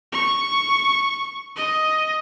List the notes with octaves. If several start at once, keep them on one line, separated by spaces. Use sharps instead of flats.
C#6
D#5